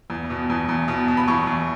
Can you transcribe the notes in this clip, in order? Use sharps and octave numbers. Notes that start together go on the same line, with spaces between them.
E2
B2
E2
E2
B2
B2
B5
E2 C#6
E2